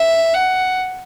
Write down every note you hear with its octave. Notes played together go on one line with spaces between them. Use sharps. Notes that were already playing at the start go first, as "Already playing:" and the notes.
Already playing: E5
F#5